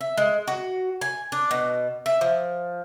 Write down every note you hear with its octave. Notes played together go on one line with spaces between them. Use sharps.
E5
G#3
F#4
G#5
D4
B2
E5
F3